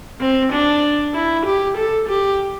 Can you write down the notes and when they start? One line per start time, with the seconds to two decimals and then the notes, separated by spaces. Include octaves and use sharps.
0.21 C4
0.52 D4
1.14 E4
1.45 G4
1.77 A4
2.08 G4